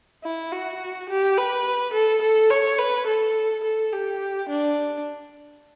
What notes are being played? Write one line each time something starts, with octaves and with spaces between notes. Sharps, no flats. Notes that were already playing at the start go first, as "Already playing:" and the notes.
E4
F#4
G4
B4
A4
A4
C#5
B4
A4
A4
G4
D4